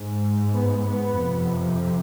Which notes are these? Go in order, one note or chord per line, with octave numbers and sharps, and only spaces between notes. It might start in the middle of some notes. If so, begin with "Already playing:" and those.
Already playing: G#2
B3
B3
F2 C3